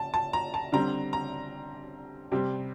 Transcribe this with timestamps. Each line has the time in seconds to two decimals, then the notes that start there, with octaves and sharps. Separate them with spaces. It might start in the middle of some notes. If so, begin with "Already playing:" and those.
Already playing: A5
0.14 A5
0.33 A#5
0.54 A5
0.72 D3 G3 C4 A#5
1.13 A#5
2.32 C3 G3 C4